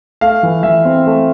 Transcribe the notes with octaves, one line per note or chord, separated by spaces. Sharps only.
A3 F5
E3
E3 E5
C4
A3